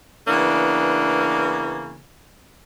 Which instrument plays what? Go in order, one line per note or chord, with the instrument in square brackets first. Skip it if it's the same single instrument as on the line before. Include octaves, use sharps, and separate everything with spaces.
[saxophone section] C#3 E3 A#3 B3 D4